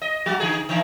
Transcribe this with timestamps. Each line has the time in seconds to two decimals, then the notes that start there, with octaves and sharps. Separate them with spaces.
0.01 D#5
0.26 F#3 F#4
0.40 D3 G#4
0.69 D3 E3